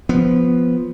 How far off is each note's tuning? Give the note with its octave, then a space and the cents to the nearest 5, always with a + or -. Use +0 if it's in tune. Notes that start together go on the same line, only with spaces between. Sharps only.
F3 +0 B3 +0